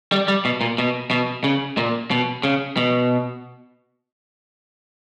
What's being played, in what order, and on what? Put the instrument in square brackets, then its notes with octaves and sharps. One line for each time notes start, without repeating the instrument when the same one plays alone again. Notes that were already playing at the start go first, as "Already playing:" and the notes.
[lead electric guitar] G3
G3
B2
A#2
B2
B2
C#3
A#2
B2
C#3
B2